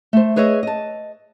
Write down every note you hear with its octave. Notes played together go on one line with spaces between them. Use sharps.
A3 C5
G#4 B4 C#5 D#5 E5
D#5 A5